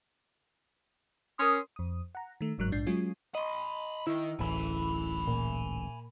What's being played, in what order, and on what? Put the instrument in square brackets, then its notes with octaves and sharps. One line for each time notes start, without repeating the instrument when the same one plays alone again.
[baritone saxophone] C#4 [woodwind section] A#4 C6 D#6
[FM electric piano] F2 D#6
F#5 A#5
D#3 A3
G1 G#2 F#3 A#4 F#6
A#1 G#2 D4 G6 C7
F#3 G#3 C#4 F4 G#4
[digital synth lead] D#5 [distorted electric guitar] B5 C6
[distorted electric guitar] D#3 [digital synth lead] E4
[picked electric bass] D1 A1 [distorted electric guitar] G#5 B5
[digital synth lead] A#2